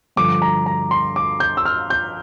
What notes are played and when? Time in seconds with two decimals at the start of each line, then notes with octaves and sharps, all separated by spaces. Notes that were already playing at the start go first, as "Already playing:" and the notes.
0.16 G2 D3 F3 D6
0.42 A#5
0.66 A#5
0.91 C6
1.16 D6
1.40 G6
1.57 E6
1.65 F6
1.90 G6